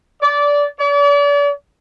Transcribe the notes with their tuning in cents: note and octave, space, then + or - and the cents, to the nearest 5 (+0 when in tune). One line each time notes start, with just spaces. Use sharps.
D5 -20
D5 -40